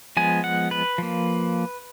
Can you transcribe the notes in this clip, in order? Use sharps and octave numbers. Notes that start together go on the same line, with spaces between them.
F3 G#3 B3 G#5
F#5
B4
F3 A#3